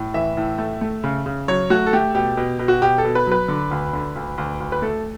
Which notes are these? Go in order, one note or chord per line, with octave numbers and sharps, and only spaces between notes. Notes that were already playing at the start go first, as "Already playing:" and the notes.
Already playing: A2
E3 E5
A2
A3
A3
C#3
C#3
F#3 C#5
A3 F#4
A4
A3 G4
B2 G4
B2
B2
F#4
B2 G4
A4
B2
B4
F#3 B4
D3
D2
D3
D2
D2
D2
B4
A3 A4